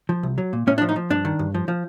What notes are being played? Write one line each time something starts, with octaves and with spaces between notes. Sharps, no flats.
F3
C2
F#3
A#2
A2 C#4
D4
F3
D#4
F3
G2 D4
D#3
G2
F3
F3